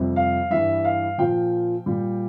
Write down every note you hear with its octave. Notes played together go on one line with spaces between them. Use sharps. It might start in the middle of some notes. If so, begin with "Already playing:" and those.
Already playing: F2 C3 G3
F5
G2 E3 G3 E5
F5
A#2 F3 G5
A#2 G3